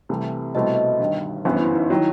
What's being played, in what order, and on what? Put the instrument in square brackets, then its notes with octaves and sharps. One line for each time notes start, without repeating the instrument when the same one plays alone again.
[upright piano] C2 C3 E3 A3
[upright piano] C2 B2 A3 C4 E4 [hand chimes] D#5
[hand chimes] D#5
[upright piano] G1 G2 D#3
[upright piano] G1 F#2 E3 B3 [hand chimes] C5
[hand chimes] E4
D#4
[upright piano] D#3 F#3 [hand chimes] E4